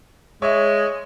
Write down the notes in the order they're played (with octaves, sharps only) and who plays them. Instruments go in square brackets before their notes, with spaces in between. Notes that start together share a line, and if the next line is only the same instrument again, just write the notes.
[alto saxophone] G#3 [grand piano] C#5 E5 C#6